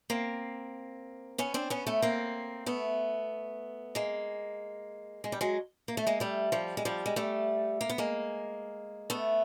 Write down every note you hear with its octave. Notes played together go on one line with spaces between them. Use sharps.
A#3 C4
B3 C#4
C4 D4
B3 C#4
A3 B3
A#3 C4
A3 B3
G#3 A#3
G#3
G3
F#3 G#3
A#3
A3
G#3 A#3
G3 A3
F3 G3
G#3
F3 G3
G#3
G3 A3
A#3
B3
G#3 A#3
A3 B3